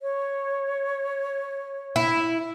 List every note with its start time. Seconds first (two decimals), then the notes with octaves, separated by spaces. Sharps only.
0.02 C#5
1.96 E4